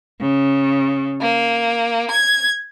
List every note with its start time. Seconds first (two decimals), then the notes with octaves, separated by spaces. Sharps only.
0.20 C#3
1.21 A#3
2.12 G#6